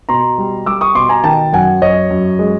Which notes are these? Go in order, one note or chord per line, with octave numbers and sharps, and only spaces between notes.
B2 A#5 C6
G3
G3 D6 E6
C#6 D#6
B2 C6 D6
G#5 A#5
D#3 G5 A5
F#2 F#5 G#5
F#2 C#5 D#5
F#2
G#3